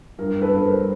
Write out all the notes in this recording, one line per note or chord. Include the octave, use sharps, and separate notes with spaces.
G2 A#4
A4 B4
G2
B4
A#4 C5